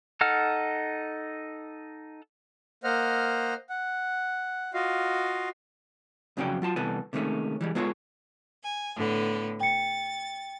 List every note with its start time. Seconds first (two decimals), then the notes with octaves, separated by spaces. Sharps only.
0.21 D#4 A4 F#5 F6
2.84 A#3 C5 D#5 F#5 F6
3.69 F#5
4.74 F4 F#4 D#5 F5
6.37 F2 C#3 F#3 C#4 D5 G5
6.62 F#3 F4 A5 C6
6.76 C2 E3 B3 A4 G#5
7.13 C3 D#3 G#3 A3 C#4
7.61 E3 G3 G#3
7.75 G#3 B3 F4 G#4 A4 C#5
8.63 G#5
8.95 A2 D3 B3
9.60 G5 A6 C#7